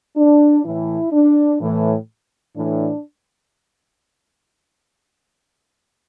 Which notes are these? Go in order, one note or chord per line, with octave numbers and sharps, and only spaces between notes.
D4
A2 E3 E4
D4
A2 E3
A2 E3 D4